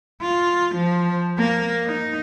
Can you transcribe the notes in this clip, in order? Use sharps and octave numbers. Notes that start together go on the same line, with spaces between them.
F4
F3
A#3
D#4